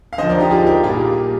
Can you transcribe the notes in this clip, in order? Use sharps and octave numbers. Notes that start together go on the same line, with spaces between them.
F5
D3 F3 C5 D#5
A#4 D5
D#4 G4
F4 G#4
G4 A#4
A#2 G3 F4 G#4